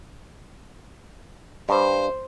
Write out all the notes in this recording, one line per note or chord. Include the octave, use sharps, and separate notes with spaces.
G2 C5